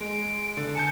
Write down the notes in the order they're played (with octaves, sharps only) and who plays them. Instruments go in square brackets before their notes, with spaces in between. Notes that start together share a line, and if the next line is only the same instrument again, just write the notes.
[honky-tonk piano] G#3 [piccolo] D7
[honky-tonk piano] D3
[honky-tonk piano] G#5 A5 G6 [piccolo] C#7